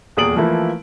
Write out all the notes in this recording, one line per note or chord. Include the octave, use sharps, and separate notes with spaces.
D#1 E2 G#4 D#6 D7 F#7
E3 F3 A3 A#3 E4